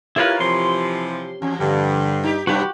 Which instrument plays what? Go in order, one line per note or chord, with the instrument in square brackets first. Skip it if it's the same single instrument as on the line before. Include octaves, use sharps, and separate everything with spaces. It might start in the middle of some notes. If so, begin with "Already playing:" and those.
[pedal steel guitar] E4 F4 B4 [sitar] G4 A#4 C#5
[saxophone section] C3 E3 F3 [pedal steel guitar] C6
[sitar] E2 [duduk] C#4
[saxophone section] G2 [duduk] D3
[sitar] D#4 G4
[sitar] F#2 C3 B4 [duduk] G3 [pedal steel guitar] F#4 G4